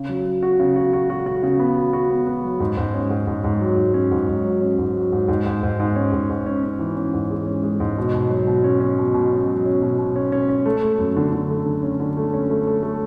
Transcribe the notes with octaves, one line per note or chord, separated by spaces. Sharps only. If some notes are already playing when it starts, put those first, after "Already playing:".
Already playing: C#3
F#3
F#3
F#4
C#3
F#4
F#4
F#4
F#4
C#3
B3
F#4
F#4
B3
B3
F#3
G#2
G#2
C#4
G#2
G#2
G#2
F#3
G#2
C#4
G#2
G#2
F#3
C#4
G#2
F#3
G#2
G#2
G#2
G#2
G#2
C#4
G#2
G#2
C#4
C#4
E3
C#4
G#2
G#3
C#4
G#3
G#2
B2
B2
F#3
B2
C#4
C#4
B2
B2
C#4
F#3
C#4
B2
B2
C#4
C#4
C#4
A3
A3
F#2
D3
D3
A3
D3
C#4
D3
A3
C#4
A3
A3
A3